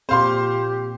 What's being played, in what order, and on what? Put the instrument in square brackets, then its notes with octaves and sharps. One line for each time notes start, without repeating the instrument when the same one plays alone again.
[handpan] A#2 C4 [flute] G4 [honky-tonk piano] C5 F5 C6